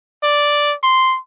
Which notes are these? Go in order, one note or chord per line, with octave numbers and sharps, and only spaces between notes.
D5
C6